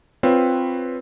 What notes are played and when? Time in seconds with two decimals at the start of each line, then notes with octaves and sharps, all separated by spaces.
0.23 C4 F4 B4 C#5